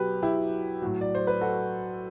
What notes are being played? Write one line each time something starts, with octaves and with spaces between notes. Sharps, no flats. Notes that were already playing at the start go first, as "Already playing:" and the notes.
Already playing: B2 F#3 G4 B4
E4 G4
A2 F#3
D5
C5
B4
F#4 A4